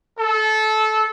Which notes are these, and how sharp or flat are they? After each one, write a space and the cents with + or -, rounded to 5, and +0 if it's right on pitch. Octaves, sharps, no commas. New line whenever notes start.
A4 -20